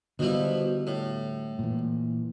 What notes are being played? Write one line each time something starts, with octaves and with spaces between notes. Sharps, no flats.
B2 D3 F3 G3 E4
A2
A#2 E3